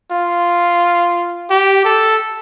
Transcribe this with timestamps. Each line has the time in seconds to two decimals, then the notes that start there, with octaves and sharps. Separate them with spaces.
0.12 F4
1.50 G4
1.85 A4